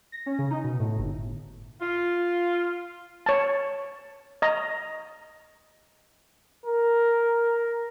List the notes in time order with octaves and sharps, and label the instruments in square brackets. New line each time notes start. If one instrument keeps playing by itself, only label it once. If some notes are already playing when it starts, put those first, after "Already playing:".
[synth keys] A#6
C#4
C#3
D#4
B2
A2
G1
[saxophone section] F4
[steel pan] C#5 A5
D#5 A#5
[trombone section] A#4